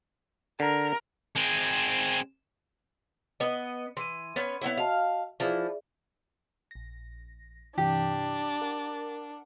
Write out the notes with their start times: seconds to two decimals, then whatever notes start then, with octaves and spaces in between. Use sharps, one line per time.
0.60 D3 A#4
1.36 G#3 C4
3.40 B3 D#5
3.97 E3 C6 D#7
4.36 B3 C#4
4.61 B3 C4 E4 C#5 F#5
4.77 F#4 D#5 F5 A5
5.40 E3 F3 G#4 D5 E5
6.71 A#1 A#6
7.78 G2 C3 E3 D4 G4
8.61 A#4 F#5